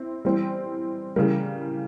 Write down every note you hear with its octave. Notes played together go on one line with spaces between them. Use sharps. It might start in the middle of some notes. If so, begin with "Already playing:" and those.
Already playing: C4 E4
E3 G3 C4
C#3 E3 G3 A#3